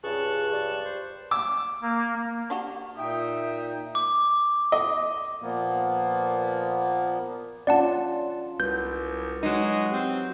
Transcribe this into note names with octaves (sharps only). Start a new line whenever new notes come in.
C#2 G2 G#4 A5 C#6 F#6
G4 D5
C5
D6 E6
A#3
D4 F#4 G4
A#2 D#4 E5 G5 D#6
D6
D#5
A#2 F3 A#3 B3
C#4 D4 F4 D5 F#5 A5
C2 F#4 B4 G6
F#3 G#3 D#4
C4 G4